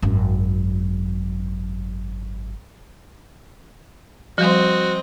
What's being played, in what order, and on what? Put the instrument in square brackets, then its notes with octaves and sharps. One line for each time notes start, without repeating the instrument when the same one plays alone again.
[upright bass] G#1 F#2
[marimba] F3 G3 [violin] C4 D#5 [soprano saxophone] F#4